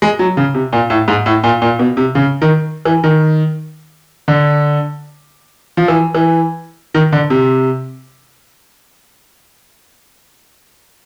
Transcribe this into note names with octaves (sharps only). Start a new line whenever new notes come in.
G#3
F#3
C#3
C3
A#2
A2
G#2
A2
A#2
A#2
B2
C3
C#3
D#3
E3
D#3
D3
F3
E3
E3
D#3
D3
C3